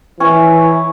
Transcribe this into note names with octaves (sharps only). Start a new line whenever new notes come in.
E3 C#4